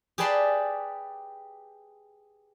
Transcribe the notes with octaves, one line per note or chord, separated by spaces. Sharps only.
G4 G#4 B4 D5 A5 C6